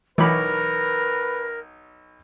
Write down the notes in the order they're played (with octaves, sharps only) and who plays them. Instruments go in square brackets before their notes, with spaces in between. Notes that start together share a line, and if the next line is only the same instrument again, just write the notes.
[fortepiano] B1 C#5 D6 [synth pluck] E3 B5 [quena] A#4 [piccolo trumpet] B4